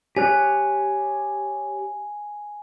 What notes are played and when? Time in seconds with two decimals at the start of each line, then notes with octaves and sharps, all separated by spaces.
0.16 G4 C#5 G#5 F#6